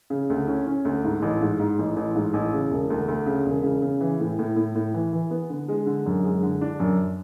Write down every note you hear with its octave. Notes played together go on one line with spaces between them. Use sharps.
C#3
D2
C#4
C#4
D2
G#2
A1
G#2
G#2
A1
A1
G#2
A1
C#3
E1
D2
D2
C#3
E1
C#3
C#3
E3
A2
A2
A2
A2
E3
E3
B3
D3
G#3
D3
F#2
G#3
D3
D4
F#2